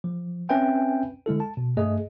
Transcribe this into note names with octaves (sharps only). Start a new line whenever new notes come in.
F3
C4 C#4 B4 E5 G5 G#5
D3 G#3 E4 A4
A5
B2
G2 A3 G#4 D#5